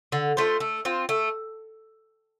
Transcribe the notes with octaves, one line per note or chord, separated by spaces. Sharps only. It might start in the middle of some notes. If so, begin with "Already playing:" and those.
D3
A3 F4 C5
A3
C4 F4
A3